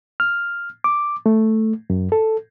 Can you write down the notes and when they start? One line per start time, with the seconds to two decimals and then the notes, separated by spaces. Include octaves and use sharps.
0.20 F6
0.84 D6
1.26 A3
1.90 F#2
2.12 A4